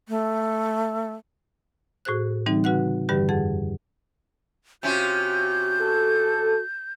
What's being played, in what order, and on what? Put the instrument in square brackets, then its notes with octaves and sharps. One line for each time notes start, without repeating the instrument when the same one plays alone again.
[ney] A3
[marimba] A2 F#4 G#4 C5 F#6
D3 E3 G3 C4 D#4
C#3 F#4 B4 F#5 F#6
G2 D3 E3 G3 G4 B4
F2 G#4 F#5 A6
[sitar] C3 C#4 F4 [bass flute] F#4 [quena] G6
[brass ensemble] A4